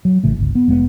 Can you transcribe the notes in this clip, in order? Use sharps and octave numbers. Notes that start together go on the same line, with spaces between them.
F#3
A1 C#3 A3
G1 C#2
B3
F1 G#3 B3